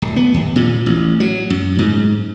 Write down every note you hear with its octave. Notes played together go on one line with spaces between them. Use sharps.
D1
B3
D#2
A#2
A1
F#3
F#2
G#2